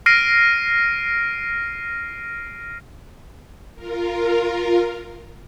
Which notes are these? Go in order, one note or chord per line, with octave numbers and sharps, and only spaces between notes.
F6 A#6 C7 D7 D#7
F4 A#4